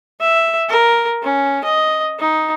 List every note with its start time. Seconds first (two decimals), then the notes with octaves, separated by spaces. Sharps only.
0.20 E5
0.69 A#4
1.22 C#4
1.64 D#5
2.19 D#4